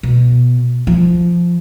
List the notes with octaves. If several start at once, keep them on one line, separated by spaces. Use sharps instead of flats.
B2
F3